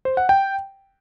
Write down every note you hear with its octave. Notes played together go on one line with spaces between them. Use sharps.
C5
F#5
G5